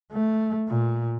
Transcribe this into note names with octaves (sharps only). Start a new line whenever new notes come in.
A3
A#2